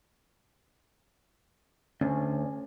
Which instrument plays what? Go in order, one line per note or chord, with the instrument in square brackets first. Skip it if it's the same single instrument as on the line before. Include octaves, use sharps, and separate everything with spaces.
[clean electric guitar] D2 [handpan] C#4